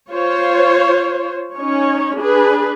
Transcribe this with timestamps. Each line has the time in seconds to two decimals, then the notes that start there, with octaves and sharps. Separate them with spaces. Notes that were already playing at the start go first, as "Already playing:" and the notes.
0.10 F4 C5 C#5
1.56 C#4 D#4 C#5
2.17 D4 G#4 B4